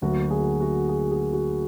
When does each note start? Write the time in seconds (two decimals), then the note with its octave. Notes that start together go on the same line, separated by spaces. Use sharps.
0.02 D2 D3 F#3 A#3 F#4
0.30 G#4
0.61 F#4
0.89 G#4
1.11 G#4
1.33 F#4